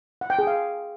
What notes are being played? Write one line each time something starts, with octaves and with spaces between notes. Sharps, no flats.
F#5
G5
G#4
F5